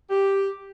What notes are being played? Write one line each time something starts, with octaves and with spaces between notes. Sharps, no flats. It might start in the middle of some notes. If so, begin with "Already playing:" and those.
G4